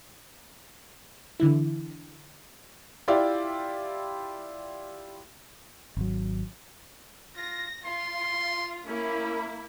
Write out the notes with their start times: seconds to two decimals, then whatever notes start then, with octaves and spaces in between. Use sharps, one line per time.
1.40 D3 E3 E4
3.08 E4 F4 G4 D5 E5 G5
5.97 G#1 F#3
7.36 F4 A#6
7.85 F4 C6
8.86 A#3 C#4 E4